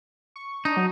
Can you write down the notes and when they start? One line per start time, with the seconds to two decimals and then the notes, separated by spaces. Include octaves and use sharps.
0.36 C#6
0.65 D4 D#4
0.77 F#3